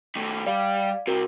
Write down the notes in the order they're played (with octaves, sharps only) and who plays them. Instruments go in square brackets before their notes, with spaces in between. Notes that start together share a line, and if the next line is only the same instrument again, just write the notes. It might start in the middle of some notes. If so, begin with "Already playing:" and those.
[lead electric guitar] D#3 A3
[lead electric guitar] G3 [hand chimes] D5 F5
[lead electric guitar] C2 C3 [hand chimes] F#4 A#4